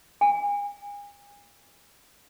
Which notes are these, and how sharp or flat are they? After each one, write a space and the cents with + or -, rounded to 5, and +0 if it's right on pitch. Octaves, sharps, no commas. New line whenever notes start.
G#5 -35